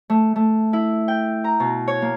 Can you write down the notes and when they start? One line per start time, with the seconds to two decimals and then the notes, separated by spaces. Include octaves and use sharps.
0.10 A3
0.36 A3
0.73 E4
1.08 G5
1.44 A#5
1.60 B2
1.88 C#5
2.02 A#3